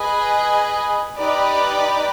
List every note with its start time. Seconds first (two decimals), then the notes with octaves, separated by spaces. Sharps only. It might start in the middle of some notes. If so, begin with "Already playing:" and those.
Already playing: G#4 B4 D#5 G#5
1.18 D#4 G4 B4 D5